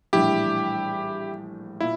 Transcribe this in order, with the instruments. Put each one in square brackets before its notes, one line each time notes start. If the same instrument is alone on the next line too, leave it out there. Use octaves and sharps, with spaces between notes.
[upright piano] A#1 A2 E3 G3 D4 [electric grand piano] E4 G4
[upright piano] A#2 [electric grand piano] E4